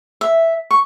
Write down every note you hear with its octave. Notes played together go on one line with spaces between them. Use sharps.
E5
C#6